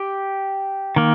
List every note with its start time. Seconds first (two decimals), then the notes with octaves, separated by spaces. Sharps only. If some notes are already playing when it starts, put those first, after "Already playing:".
Already playing: G4
0.96 D#3 A#3